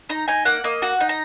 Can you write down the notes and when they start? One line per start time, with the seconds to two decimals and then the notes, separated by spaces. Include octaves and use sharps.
0.09 D#4 A#5
0.28 D#4 G#5
0.45 A#3 F#5
0.64 A#3 D#5
0.82 F#4 F#5
1.01 D#4
1.09 A#5